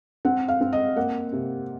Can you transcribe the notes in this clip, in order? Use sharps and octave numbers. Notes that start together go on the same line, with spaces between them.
C4 F#5
F5
C4
D#5
A#3 F#5
C3